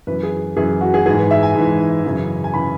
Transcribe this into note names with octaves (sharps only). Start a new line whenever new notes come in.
F#2 E3 B4
G#4
F#2 E3 G#4
F#4
G#4
G#2 E3 G#4
B4
E5
G#5
G#2 E3
F#2 C#3 E3
G#5
C#3 E3 B5